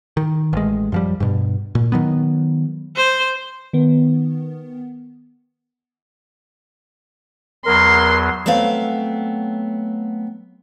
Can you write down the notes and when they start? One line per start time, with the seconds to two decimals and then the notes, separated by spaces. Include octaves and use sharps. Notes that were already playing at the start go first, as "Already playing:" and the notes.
0.17 D#3
0.53 A1 G#3
0.92 F#2 F3 G3
1.20 G2 B2
1.75 A#2
1.92 D#3 F#3 B3
2.96 C5
3.73 D#3 B3
7.66 E2 F#3 A#4 C6
8.46 F#3 A3 B3 C4 F5